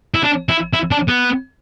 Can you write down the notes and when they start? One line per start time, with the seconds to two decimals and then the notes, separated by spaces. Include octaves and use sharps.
0.15 E4
0.23 D4
0.49 E4
0.73 E4
0.91 D4
1.08 B3